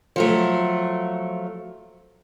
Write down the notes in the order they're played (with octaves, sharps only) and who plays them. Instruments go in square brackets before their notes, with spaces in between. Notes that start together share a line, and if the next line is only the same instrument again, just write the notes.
[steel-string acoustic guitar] F3 F#3 A3